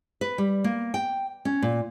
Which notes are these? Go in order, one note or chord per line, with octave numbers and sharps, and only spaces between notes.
B4
G3
A#3
G5
C#4
A#2